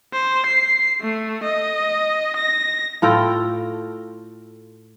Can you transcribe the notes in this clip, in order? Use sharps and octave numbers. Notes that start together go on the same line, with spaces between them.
C5
C7
A3
D#5
A#6
A2 F4 A4 G5